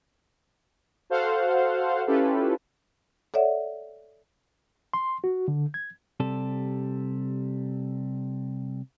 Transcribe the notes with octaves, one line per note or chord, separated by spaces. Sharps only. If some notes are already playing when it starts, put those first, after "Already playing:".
F#4 A4 C5 F5 F#5
C#4 E4 F4 G4 A4 B4
A4 C#5 D5 E5 F#5
C6
F#4
D3
G#6
C3 G3 A4